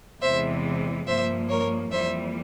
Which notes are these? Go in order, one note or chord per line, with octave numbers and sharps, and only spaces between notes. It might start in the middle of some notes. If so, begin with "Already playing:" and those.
E2 C3 E3 G#3 C5 E5
G2 F3 A#3 C5 E5
A#4 C#5
F2 E3 G3 A#3 C5 E5